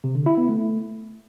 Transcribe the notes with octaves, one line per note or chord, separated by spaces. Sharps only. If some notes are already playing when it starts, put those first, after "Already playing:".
C3
D3
E4
B3
A3